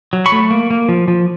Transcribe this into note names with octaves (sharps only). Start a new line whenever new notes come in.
F#3
B5 C#6
A3
A#3
A#3
F3
F3